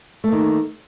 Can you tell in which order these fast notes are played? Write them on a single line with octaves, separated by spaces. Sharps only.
A3 A#3 D#3